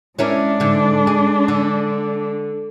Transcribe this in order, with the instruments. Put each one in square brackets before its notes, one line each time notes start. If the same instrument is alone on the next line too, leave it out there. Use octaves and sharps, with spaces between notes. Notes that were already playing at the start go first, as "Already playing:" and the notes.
[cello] G#3 D4 [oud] C#4 E4 A#4
[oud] G#2 D3
G#4
D3